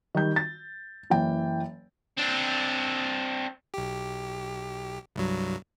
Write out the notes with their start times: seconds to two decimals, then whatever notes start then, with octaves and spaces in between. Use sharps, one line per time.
0.15 D#3 G3 G6
0.36 A6
1.10 F#1 E3 G5
2.17 C4 D4
3.74 B1 G4
5.16 C2 G2 F#3